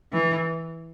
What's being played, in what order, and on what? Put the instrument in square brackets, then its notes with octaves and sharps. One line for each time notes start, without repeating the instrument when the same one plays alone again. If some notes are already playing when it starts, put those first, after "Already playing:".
[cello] E3